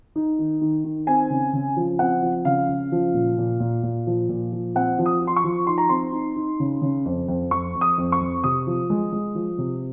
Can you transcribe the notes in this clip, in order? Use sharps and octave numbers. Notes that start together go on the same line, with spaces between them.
D#4
D#3
D#3
D#3
C4 G#5
C#3
C#3
F3
C4 F#5
F3
C#3 F5
C#3
F3
A#2
A#2
A#2
A#2
F3
A#2
F3
C4 F#5
F3
D#6
F3
C6
C#6
F3
D#4 C6
A#5
C4 C6
D#4
D#4
C#3
C#3
F2
F2
F2 C#6
F2
D#6
F2
C#6
F2
C3 D#6
F3
G#3
G#3
F3
C3